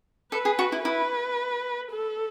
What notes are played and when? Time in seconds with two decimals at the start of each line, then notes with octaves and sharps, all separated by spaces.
0.32 A4 B4
0.45 G#4
0.59 F#4
0.72 E4
0.85 E4 B4
1.91 A4